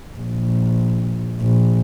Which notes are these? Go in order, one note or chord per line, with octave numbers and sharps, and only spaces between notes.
A#1
A#1